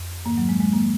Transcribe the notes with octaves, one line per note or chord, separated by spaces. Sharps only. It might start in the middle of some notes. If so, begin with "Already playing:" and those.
Already playing: F2
G#2 D#3 A#3
F#3
G#3
G#3
D#3 A#3